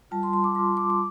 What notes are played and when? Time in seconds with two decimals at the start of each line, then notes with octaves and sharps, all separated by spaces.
0.11 G3 F4 A5
0.23 C6
0.33 C6
0.44 D6
0.55 G3 F4 C6
0.77 D6
0.90 D6